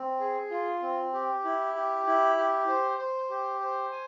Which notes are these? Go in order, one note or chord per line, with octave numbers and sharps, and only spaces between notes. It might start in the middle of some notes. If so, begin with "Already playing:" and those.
Already playing: C4
G#4
F4
C4
G4
E4
G4
E4
G4
C5
C5
G4
C5
G#5